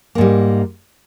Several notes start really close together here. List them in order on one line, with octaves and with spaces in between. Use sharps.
A#3 G#2 G3